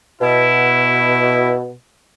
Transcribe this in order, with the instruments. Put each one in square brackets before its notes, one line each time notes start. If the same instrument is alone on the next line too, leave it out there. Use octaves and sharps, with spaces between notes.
[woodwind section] B2 [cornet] E4